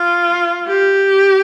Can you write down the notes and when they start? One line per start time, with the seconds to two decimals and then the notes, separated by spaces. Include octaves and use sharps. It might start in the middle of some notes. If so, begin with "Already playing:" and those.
Already playing: F4
0.67 G4